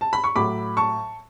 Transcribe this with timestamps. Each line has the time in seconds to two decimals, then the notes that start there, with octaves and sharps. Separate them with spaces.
0.01 A5
0.13 B5
0.24 C#6
0.36 A2 F#3 B5 D6
0.77 A5 C#6